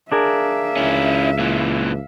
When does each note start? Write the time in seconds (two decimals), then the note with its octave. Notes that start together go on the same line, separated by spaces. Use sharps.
0.12 D4 G#4 A#4 E5 F5
0.77 C#2 C#4 E4
1.39 A#2 E3